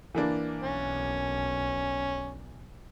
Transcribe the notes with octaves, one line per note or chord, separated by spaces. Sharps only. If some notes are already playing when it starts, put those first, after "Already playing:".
E3 A#3 D4
B1 C#4